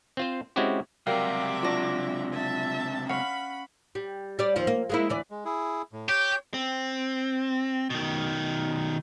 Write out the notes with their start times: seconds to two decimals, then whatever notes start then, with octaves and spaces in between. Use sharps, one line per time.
0.17 C4 F4 C5
0.56 G#3 C4 C#4 E4 F#4 G4
1.07 C#2 C3 F#3 G3 A#4 E5 F5 D6
1.63 F#3 D4 F4 C#5 A#6
2.32 E5 A5
3.10 C#4 F5 F#5 B5
3.95 G3
4.39 G3 D5
4.56 D#2 F3
4.67 A#3
4.90 G#3 A#3 E4
5.09 D2 E3 D5
5.31 G#3
5.45 E4 G#4
5.93 A2
6.09 G4 C#5 G6
6.54 C4
7.90 B2 D#3